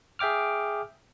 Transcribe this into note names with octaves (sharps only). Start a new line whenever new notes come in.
G#4 E5 G5 D6 F6